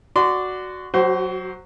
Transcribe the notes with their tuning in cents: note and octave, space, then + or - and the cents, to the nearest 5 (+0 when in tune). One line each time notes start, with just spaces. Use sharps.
F#4 +0 D5 +0 C6 -30
F#3 +0 F#4 +35 C5 +0